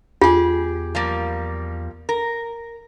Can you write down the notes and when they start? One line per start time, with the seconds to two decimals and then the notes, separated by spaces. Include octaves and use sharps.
0.22 E2 F4 G4 G#4
0.95 F3 G3 A#3
2.09 A#4